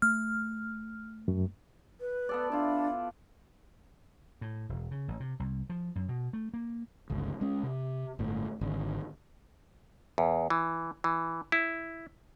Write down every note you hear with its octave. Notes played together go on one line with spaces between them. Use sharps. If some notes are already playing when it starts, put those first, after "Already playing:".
A3 F6
F#2
B4
B3 A4 D5
D4 E4 F4
A2
E1
C#3
A1
C3
C2
F3
F#2
B2
A3
A#3
G1 C#2
G#3 C#4
C3
G1 A2
G#1 D3
E2
E3
E3
E4